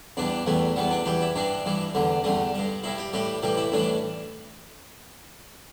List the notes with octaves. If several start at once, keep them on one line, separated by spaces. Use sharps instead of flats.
E2 E3 G3 D4
E2 E3 G3 A3
E2 E3 G3 B3
D4
E2 E3 G3 G4
E4
G2 E3 G3 D4
G2 E3 G3
E2 D3 G3
E2 D3 G3 A3
G2 G3
G2 G3 E4
G4
A2 E3 G3 G4
A2 E3 G3 G4
E4
A2 E3 G3 D4